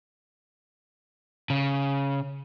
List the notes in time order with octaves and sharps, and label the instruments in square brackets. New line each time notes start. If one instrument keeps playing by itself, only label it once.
[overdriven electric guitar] C#3